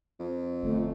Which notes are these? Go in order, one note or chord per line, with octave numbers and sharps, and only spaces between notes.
F2
G1 A3